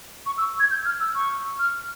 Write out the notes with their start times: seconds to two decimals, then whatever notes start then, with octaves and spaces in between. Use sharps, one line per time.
0.26 C#6
0.38 E6
0.60 G#6
0.71 G6
0.85 F6
1.00 E6
1.15 C#6
1.59 F6